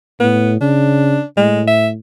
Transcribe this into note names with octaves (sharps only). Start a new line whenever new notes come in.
A2 B3
C#3 D4
A2 G#3
E5